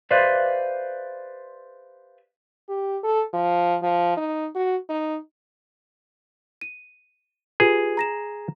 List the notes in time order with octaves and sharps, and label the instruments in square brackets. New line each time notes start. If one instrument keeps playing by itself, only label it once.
[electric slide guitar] G4 B4 C5 D5 E5 F5
[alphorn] G4
A4
F3
F3
D#4
F#4
D#4
[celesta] D#7
[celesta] F4 G4 B4 [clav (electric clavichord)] G#4
[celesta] A#5 A#6 E7